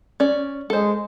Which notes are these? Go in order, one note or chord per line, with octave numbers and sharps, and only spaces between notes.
C#4 D5
G#3 A4 C5